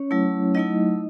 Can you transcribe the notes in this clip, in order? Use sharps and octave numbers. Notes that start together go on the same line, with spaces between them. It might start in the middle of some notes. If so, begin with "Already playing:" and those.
Already playing: C#4 C#5
F#3 A3 E4
F#3 A3 D#4 E4 D#5